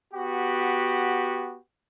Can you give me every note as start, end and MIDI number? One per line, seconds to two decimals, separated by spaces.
0.13 1.57 59
0.13 1.57 66
0.13 1.57 67